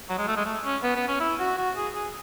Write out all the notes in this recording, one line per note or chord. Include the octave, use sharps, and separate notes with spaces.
F#3
G#3
A3
G#3
A3
C#4
B3
B3
C#4
E4
F#4
F#4
G#4
G#4